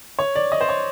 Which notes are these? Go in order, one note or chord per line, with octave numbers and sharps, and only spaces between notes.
C#5
D5
D#5
C5
C#5